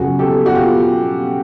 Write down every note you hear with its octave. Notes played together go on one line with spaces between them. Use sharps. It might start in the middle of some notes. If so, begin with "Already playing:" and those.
Already playing: F#2 C#3 F3 F#4 G#4
G4 A4
F#4
F4 G4